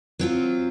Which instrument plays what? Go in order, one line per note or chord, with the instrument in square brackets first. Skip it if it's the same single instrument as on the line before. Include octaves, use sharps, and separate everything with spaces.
[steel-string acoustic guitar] F#3 C4 F4